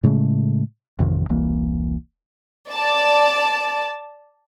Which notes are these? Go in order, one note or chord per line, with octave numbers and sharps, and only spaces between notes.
A2 C#3 G#3 A3
A1 F2 C3 D#3
E1 C2 E3 A#3
D5 A5